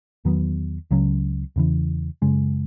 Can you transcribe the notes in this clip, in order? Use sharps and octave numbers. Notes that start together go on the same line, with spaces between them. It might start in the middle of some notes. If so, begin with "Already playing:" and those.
E2 D#3 F#3 B3
C#2 C#3 F#3 C#4
E2 C#3 E3
F#2 C#3 G#3